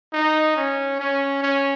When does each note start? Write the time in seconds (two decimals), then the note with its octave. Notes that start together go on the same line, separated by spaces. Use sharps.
0.13 D#4
0.56 C#4
1.00 C#4
1.42 C#4